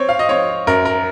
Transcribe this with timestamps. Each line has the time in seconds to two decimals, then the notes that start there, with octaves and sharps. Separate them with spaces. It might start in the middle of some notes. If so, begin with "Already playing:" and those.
Already playing: C4 C#5
0.09 F5
0.19 D#5
0.29 C4 C#5
0.67 F#2 A#4
0.85 A#4